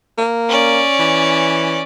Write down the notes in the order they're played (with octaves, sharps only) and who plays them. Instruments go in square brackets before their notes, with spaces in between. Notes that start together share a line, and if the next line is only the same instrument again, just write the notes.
[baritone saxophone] A#3
[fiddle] C#4 D5
[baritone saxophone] E3